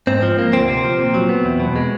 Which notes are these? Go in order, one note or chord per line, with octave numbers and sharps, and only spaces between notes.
G#2 C4
F3
A#3
D2 C4
C3
F3
A#2
F#3
B3
E2
B2
G#3